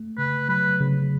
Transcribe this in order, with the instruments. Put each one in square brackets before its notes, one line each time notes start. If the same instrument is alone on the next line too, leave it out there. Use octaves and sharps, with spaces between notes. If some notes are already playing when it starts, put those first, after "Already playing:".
Already playing: [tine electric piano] A3
[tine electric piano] C#3 [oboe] B4
[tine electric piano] F#3 [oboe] B4
[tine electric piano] C#3